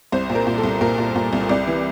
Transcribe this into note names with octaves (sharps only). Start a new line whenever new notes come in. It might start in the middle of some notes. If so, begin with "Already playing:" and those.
C2 C5
A#2
A#4
A#2
A4
C2
A#2 A#4
A#2
A#2
C2
C2 D5
E3